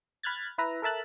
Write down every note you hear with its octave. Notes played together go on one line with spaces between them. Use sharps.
B5 F6 F#6 G#6 A6
E4 B4 E5 A#5
A4 A#4 E5 A5 F#6